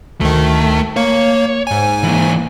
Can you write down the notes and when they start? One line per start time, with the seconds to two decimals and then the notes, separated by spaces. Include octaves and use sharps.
0.21 D2 D#3 A3
0.96 A#3 C#5
1.67 G#2 G#5
2.03 E3 A#3